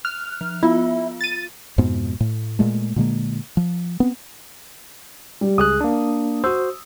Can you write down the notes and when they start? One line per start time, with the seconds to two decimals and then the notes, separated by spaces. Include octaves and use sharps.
0.05 F6 F#6
0.41 F3
0.63 B3 E4 F4
1.21 A6 D#7
1.78 F2 G#2 B2 B3
2.20 A2
2.59 A#2 G#3 A3
2.96 A#2 D3 G#3 A#3
3.57 F3
4.00 B3 C4
5.41 G3
5.58 C#2 G#4 D#6 F#6
5.81 A#3 D4
6.44 F#4 C5 E6